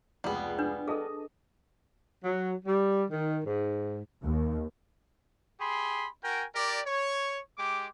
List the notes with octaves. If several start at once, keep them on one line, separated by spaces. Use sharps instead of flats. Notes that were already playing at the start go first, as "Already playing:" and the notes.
F1 C#2 G3 B3 G#4
D4 B4
G#4 A4 D#5 A5 D#6
F#3
G3
D#3
G#2
D#2
G4 G#4 B5 C6
F#4 A#4 G5 G#5
G4 A#4 D5
C#5
G#3 G4 D6